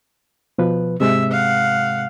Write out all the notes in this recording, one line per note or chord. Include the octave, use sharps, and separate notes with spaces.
B2 F3 B4
G#2 C3 G#3 E5
F5 F#5